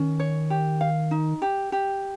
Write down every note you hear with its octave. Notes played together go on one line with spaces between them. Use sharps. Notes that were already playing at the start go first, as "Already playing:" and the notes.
Already playing: D#3 C#4
C#5
G4
F5
D#4
G4
G4